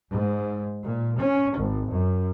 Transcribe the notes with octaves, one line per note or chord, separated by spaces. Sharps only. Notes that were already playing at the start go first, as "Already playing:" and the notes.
G#2
A#2
C#4
G#1
F#2